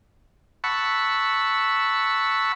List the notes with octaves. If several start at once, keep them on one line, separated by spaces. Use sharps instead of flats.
F#5 A5 B5 C#6 E6